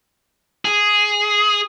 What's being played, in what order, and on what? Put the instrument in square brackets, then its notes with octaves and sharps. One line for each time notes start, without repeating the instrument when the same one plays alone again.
[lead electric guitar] G#4